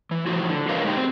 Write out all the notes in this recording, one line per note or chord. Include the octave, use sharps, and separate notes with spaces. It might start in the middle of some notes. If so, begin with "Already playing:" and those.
E3
A2 F3 E4 F#4
D3
F#4 A#4 B4 C#5 D#5 F5
A2 G#3 D#4 G4
C4